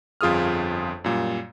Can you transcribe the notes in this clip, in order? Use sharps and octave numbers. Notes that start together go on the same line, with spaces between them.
G1 F2 F4 G#4 D#6 F6
F#2 A#2 G3